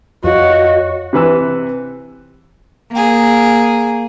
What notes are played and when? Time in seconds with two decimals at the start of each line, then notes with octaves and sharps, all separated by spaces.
0.24 F2 F#4 C#5 D#5 F5
1.13 C3 E3 B4 E6
2.92 A#3 G#4